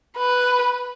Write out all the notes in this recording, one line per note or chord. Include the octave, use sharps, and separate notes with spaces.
B4